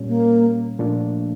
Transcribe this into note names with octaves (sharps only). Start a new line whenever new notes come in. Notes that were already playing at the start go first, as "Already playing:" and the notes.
Already playing: A#2 G3 C#4
A#3
A#2 F3 A3 D4 F4